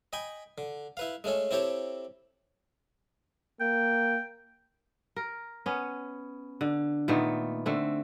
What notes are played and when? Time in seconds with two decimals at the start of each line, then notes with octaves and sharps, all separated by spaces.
0.13 D#5 G5 G#5 B5
0.58 D3
0.97 E4 B4 F5
1.24 G#3 A3 C#4 A4
1.51 C4 E4 G4 A4 C#5
3.61 A#3 G5
5.16 A#4
5.66 B3 C#4
6.61 D3
7.08 A#2 D#3 A3 B3
7.66 D3 A3 C4